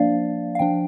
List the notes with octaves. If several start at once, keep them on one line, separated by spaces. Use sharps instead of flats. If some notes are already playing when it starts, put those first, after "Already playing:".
Already playing: F3 A#3 D4 D5 F5
F5
F3 D4 G5